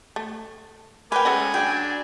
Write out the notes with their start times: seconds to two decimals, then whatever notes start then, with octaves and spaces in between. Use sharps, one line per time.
0.16 A3
1.12 A#4 B4 F5 G5 G#5 D6
1.25 G#3 C#4 A4 D#5 F#5
1.54 F#3 D4 G5